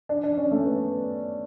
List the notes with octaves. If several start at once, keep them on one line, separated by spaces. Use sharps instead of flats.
D4
D4
C#4
A3
B3